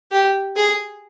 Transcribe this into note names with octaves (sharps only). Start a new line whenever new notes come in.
G4
G#4